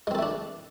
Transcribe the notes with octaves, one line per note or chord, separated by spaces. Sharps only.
G#3 A3 C4 D4 A4